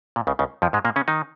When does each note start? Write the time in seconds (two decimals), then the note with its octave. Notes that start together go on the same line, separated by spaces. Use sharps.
0.16 A#2
0.27 C#2 C#3
0.39 C#2 C#3
0.62 F2 F3
0.73 G#2 G#3
0.85 A#2 A#3
0.96 C#3 C#4
1.08 D#3 D#4